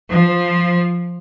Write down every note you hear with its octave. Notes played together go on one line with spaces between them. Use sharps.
F3